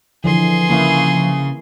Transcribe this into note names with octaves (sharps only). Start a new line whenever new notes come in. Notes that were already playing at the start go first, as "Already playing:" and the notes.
D3 E3 F3 G#4 C6
C#3 A#3 E4 F5